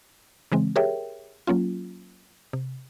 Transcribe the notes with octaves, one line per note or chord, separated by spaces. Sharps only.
C#3 E3 G#3 C4
G4 G#4 A#4 C#5 E5 G5
F#3 A#3 C#4 F4
C3